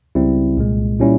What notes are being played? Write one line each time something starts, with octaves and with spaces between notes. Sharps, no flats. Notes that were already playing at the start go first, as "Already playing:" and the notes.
C#2 C#3 G3 C4 E4
C2 A#2 G#3
A#2 G3 C#4 E4